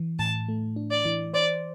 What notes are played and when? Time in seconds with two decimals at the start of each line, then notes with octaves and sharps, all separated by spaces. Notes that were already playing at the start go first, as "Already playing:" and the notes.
Already playing: E3
0.19 A2 A5
0.48 A3
0.76 D4
0.91 D5
1.05 E3
1.34 C5 D5